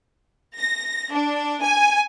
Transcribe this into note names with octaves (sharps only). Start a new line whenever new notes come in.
A#6
D4
G#5